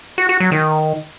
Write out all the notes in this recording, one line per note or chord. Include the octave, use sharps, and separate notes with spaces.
F#4
F#4
F#3
D#3